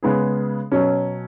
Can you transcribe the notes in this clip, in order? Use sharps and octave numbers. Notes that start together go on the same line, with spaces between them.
C#3 G#3 B3 G#4
B2 F#3 C#4